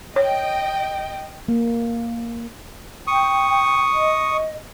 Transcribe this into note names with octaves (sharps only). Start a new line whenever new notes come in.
C#5 D#5 G5
A#3
G5 C#6 D#6
D#5